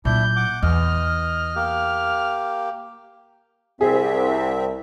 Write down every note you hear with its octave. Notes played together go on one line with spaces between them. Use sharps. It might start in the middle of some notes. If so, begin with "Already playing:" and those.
A#2 F#3 D4 E4 G6
F#5 D6
E2 D#5 F6
A#3 G4
C2 C4 G#4 E5